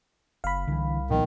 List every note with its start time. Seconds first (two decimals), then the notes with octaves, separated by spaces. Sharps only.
0.44 F#1 F5 B5
0.67 C2 D3 E3
1.10 A#2 D#3 F3 B3